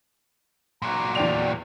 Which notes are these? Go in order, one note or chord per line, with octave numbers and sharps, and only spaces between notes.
A#2 F#3 A#5
E2 D5 G5 F7